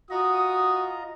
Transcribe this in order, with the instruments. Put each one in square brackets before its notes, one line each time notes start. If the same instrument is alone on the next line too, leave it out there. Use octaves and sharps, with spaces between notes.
[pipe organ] F4 D#5 A#5 [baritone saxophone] F#4 [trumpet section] D#6